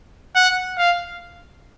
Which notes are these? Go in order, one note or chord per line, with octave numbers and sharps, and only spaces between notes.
F#5
F5